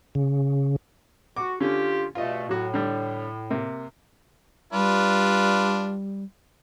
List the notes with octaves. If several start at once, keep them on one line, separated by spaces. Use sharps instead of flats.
C#3
F#4 D6
D3 C#4 F4 G4
G2 B2 A3 F4 D#5
A2 F#3 F#4
D3 G3
C3 A#3
G3 D4 F4 B4